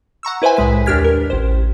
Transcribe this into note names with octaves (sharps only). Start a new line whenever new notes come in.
F#5 A#5 C#6 E6
E4 B4 C5 E5 G#5
C2 A2 G#3 B4 B6
D#2 D4 G4 F6 G#6 B6
A#4
A1 C5